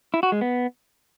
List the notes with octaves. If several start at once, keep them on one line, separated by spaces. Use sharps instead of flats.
E4
F#4
G#3
B3